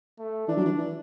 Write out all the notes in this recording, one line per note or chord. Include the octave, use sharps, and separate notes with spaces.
A3
E3 D4
F#3
E3
E3